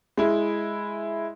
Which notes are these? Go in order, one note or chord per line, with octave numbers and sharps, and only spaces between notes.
G#3 E4